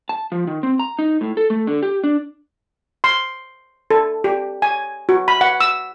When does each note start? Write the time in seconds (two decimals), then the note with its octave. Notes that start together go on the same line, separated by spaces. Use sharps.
0.09 A5
0.32 F3
0.47 D#3
0.63 C4
0.80 A#5
0.99 D#4
1.21 A2
1.37 A4
1.50 A3
1.67 D3
1.83 G4
2.04 D4
3.04 C6
3.91 A4
4.24 G4
4.62 G#5
5.09 F#4
5.28 B5
5.41 F#5
5.60 E6